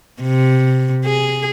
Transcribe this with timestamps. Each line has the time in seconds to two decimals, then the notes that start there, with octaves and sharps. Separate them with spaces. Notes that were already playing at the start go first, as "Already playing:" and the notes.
0.22 C3
1.06 G#4